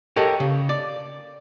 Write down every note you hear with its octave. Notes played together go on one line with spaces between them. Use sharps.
G4 A4 A#4 C#5 D#5 F#5
C#3
D5